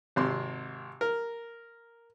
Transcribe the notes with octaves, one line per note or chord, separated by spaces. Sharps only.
G#1 C3 C6
A#4